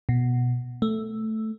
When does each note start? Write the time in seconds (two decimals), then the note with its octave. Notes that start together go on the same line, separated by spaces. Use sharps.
0.09 B2
0.82 A3